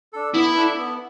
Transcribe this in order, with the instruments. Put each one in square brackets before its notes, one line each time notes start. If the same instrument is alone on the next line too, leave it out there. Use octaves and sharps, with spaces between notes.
[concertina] D4 A4
[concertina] B3 [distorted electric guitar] E4
[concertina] D4 A4
B3